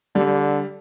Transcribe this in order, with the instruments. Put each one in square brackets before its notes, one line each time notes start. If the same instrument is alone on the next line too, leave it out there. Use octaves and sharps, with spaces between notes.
[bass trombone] D3 [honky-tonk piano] G3